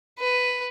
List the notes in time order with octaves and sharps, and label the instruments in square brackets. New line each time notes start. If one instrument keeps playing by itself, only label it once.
[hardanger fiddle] B4